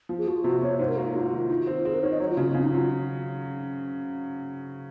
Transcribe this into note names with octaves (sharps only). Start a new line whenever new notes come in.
F3
G#4
F3 F#4
F4
C3 F#4
C3 C#5
G#2 C5
A#4
A#3 F#4
F4
G#2 F#4
F4
F#4
D#3 F4
D#3 F4
F#4
C4 F4
C4 G#4
A#4
D#3 C#5
D#5
F#3 C#5
F4
C#3 F#4
F4
C#3 C4
D#4
F#3 F4